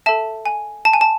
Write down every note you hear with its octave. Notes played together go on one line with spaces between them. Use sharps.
A4 E5 A5
G#5
A5
G#5
A5